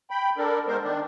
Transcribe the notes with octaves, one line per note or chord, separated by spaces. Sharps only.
G5 B5
D4 A4 A#4
G#2 G#3 B3 A#4 C5
D#3 D4